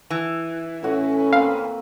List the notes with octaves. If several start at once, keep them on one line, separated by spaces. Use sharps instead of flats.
E3
A2 C#4 F#4
A#3 C4 B4 F5